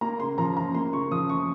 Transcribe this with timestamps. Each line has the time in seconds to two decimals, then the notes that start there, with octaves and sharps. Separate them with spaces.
0.01 A#3 A#5
0.20 C#3 C6
0.38 F3 A#5
0.56 F#2 A#5
0.75 A#3 C6
0.93 C#3 C#6
1.11 F3 D#6
1.29 F#2 C#6